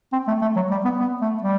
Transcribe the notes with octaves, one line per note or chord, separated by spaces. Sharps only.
C4
A3
A3
F#3
G3
B3
B3
A3
G3